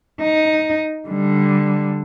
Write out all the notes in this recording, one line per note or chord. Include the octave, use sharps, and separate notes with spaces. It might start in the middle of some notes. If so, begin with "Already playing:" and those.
D#4
D3 G3